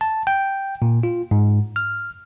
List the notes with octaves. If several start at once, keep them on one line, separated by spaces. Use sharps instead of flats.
A5
G5
A#2
F4
G#2
F6